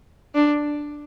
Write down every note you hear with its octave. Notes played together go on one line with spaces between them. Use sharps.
D4